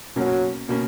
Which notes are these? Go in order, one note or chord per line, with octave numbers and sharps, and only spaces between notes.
B2 F#3 A#3 C#4
B2 A#3 C#4